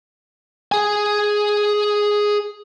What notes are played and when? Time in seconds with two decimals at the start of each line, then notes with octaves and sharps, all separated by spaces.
0.72 G#4 G#5